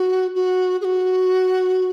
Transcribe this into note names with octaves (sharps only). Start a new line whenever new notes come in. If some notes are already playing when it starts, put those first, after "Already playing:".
Already playing: F#4
F#4
G#4
F#4